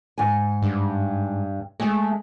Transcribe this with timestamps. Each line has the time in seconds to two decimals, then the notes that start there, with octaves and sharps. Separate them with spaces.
0.18 G#2 G#5
0.62 G2
1.80 G#3 A3 G#4